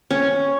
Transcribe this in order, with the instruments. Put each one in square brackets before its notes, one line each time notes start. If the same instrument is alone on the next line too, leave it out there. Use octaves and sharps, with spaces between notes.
[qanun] C#4